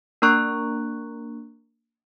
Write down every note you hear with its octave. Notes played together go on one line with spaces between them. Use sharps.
A#3 D4 A#4 A#5 C#6 F#6